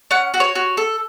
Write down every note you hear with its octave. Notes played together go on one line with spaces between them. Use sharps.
C#4 F#5
F#4
C#5
F#4
A4